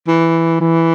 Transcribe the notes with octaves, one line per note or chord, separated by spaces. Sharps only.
E3
E3